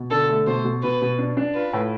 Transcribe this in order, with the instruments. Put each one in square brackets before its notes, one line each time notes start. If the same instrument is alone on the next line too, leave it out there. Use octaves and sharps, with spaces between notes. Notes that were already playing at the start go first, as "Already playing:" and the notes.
Already playing: [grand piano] B2
[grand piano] D3 [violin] A4
[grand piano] A3
[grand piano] B2 [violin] C5
[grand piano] B2
[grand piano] B2 [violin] B4
[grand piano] B2
D4
D4
[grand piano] F4 [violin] B4
[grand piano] A2